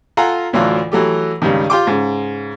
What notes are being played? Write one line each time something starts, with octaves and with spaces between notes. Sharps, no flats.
F4 A4 F5 F#5 G#5 A#5
D2 A2 E3 F#3 F4
E3 F#3 A3 G4
C#2 G2 D#3
F4 G4 G5 C6 D6
G#2 C#3